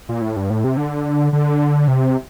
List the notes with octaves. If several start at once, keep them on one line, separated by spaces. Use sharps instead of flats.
A#2
A2
G2
A2
C3
D3
D3
C3